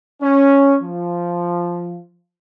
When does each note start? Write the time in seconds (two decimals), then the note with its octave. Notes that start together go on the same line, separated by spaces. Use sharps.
0.21 C#4
0.82 F3